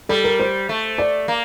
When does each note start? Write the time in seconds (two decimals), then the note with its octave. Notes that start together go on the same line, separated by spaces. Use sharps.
0.09 G3 A4
0.24 A#4
0.40 C5
0.69 A3
0.98 D5
1.28 A#3